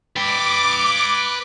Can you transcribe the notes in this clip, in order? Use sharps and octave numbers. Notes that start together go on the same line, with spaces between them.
B4 G5 D6